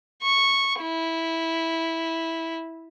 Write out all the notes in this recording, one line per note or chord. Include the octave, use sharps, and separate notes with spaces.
C#6
E4